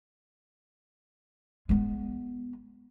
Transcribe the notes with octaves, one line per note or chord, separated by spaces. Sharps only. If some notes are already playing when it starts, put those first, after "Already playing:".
G#3 B3